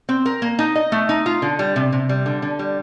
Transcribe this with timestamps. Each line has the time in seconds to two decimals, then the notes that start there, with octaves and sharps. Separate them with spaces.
0.09 C4
0.26 A#4
0.42 A#3
0.59 D#4
0.75 D#5
0.92 A3
1.09 D#4
1.26 F4
1.42 D3
1.59 G3
1.76 C3
1.92 C3
2.09 G3
2.26 D3
2.42 D3
2.59 G3